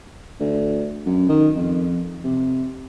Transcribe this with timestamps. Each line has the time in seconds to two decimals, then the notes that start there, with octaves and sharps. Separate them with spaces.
0.40 D2
1.06 F#2
1.29 D#3
1.56 F2
2.24 C3